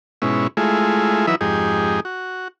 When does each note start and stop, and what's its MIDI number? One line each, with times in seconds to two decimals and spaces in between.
0.22 0.47 44
0.22 0.47 47
0.22 0.47 61
0.22 0.47 64
0.57 1.26 56
0.57 1.26 57
0.57 1.26 64
0.57 1.26 65
0.57 1.26 68
1.27 1.35 52
1.27 1.35 54
1.27 1.35 63
1.27 1.35 64
1.27 1.35 71
1.27 1.35 76
1.41 2.00 41
1.41 2.00 44
1.41 2.00 63
1.41 2.00 67
1.41 2.00 68
2.05 2.48 66